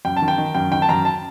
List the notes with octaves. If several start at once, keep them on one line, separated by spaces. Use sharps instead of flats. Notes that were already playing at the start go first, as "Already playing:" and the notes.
F#2 G5
A5
D#3
G5
D#3
F#2 G5
D#3 G5
A5
F#2 A#5
A5